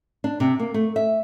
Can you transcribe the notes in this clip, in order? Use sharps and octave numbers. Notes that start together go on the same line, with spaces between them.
D4
C3
A#3
A3
E5